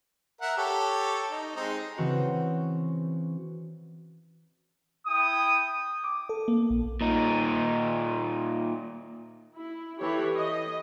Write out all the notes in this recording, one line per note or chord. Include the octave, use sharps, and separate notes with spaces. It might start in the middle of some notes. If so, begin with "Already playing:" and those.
A#4 E5 F#5
G4 A4 C#5
D#4
G#3 C4 D#4
C#3 E3 C4 F#4
E4 G5 D#6
D6
A4
A#3
A#1
A#2 D#4
E4
E3 G4 A4 C#5
D#5